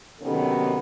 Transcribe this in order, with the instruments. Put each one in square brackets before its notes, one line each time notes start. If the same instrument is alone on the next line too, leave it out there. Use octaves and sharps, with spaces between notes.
[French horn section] C3 D#3 F#3 B3 C#4 A4